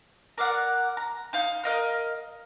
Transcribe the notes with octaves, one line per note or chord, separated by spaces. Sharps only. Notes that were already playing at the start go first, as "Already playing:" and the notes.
A#4 D5 F5 F#5
A#5
D#4 F5 G6
A#4 D#5 F5